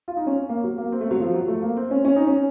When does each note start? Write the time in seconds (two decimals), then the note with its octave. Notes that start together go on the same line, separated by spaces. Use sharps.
0.08 F4
0.17 D#4
0.27 C#4
0.49 A#3
0.64 F#3
0.78 A#3
0.92 C4
1.01 A3
1.11 F#3
1.20 F3
1.34 F#3
1.48 A3
1.62 A#3
1.77 C4
1.91 C#4
2.05 C#4
2.16 D#4
2.27 C#4